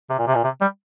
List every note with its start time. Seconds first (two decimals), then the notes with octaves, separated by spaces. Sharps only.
0.10 C3
0.19 A#2
0.27 C3
0.35 A#2
0.44 C3
0.61 G3